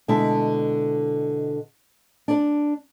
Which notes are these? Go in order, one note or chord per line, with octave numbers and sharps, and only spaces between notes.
B2 D3 G#3 E4 E5 A5
D4 D5